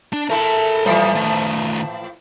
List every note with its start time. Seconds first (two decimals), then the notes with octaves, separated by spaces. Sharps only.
0.13 D4
0.30 A3 E4 A#4 A5
0.86 A2 E3 F3 G3
1.15 D#3 A3